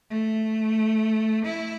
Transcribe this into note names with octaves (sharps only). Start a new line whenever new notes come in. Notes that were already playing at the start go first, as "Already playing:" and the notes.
A3
E4